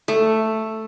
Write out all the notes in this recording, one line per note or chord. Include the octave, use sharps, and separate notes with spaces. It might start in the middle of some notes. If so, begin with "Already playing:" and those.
A3